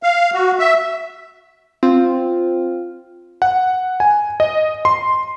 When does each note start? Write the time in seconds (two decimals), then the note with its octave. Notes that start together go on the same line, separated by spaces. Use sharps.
0.03 F5
0.34 F#4
0.59 E5
1.83 C4 F4
3.42 F#5
4.00 G#5
4.40 D#5
4.85 C6